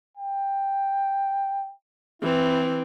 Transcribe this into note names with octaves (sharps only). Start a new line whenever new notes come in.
G5
E3 C4 E4